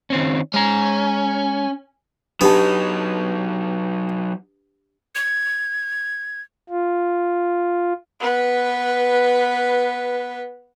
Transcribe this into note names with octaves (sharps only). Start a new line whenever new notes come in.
D#3 C4 C#4
G#3 C#4 A#5
F#3 B3 D4 D#4 G4 A5
G#6
F4
B3 B4